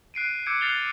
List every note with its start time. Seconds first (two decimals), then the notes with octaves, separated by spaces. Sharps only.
0.14 F#6 C7 D7 D#7
0.46 D6 E6 G6 G#6 C#7 D7
0.61 F6 F#6 A6 C7 F7 G7